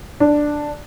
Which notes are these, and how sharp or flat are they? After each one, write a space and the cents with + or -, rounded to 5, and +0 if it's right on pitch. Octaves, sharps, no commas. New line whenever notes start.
D4 +5